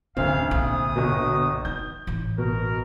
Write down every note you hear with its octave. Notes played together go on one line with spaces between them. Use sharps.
F1 D2 C4 C#4 F5
A#1 D3 D#6
G1 B2
D#4 G6
A1
B2 A#4